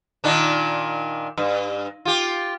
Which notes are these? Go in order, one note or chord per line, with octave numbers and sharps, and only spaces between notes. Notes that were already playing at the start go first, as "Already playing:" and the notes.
A#2 D#3 D4
G2
F4 G4